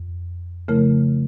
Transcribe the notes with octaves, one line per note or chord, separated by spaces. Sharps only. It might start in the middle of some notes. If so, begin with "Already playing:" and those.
Already playing: F2
C#3 F3 A3 E4 A#4